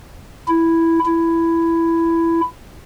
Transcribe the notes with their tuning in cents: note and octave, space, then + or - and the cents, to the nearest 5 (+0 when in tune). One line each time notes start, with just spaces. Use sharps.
E4 +0
E4 +10